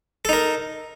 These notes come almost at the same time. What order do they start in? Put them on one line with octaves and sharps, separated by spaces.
A4 D#4 A#4